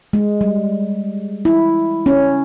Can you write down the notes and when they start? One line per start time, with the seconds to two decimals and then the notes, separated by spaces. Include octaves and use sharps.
0.13 G#3
0.41 G3
1.45 E4
2.06 C#4